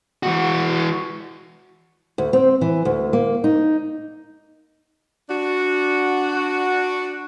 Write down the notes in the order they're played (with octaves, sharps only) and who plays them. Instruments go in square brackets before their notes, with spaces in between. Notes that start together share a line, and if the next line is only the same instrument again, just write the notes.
[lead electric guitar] E3 F#4
[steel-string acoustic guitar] D2
C4
E3
D2
A#3
D#4
[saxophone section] D4 F#4